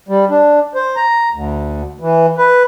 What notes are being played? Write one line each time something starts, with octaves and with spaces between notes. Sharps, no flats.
G3
D4
C5
A#5
D2
E3
B4